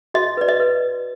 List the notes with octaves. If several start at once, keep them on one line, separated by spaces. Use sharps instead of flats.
F#4 D#5
B4 D5
D#5
B4